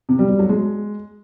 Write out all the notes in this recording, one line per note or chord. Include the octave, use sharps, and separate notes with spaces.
C3
G3
G3
F#3
G#3